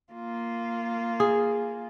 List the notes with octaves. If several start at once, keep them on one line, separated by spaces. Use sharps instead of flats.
A#3 F4
G#4